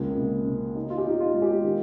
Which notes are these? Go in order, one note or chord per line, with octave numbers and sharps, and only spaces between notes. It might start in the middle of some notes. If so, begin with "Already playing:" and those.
Already playing: C#2 G#3 A#3
C3
C3
D#4
F4
G4
D#4
F4
G#3
G4
D#3